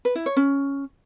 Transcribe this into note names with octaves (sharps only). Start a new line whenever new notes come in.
B4
E4
C#5
C#4